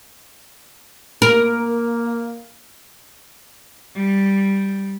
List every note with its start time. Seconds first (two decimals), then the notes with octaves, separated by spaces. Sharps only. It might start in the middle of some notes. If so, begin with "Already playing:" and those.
1.22 A#3 A#4
3.92 G3